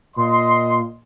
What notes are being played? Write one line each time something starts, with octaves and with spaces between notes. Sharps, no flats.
A#2 D#5 C6